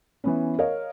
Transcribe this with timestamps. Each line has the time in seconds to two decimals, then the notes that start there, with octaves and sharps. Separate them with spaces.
0.24 E3 B3 C#4
0.59 A#4 C#5 D#5 F5